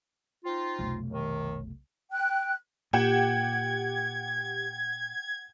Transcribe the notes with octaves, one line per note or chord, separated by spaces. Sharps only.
C4 D#4 F4
F1 B1
D#2 C3 D#3
G5 F#6
A#2 G4 F#5 G5 G#6 E7